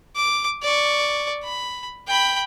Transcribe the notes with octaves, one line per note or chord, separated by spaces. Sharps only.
D6
D5 C#6
B5
G5 B5